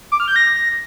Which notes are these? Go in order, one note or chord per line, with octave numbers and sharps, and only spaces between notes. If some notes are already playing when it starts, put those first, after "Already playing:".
D6
F6
G6
A#6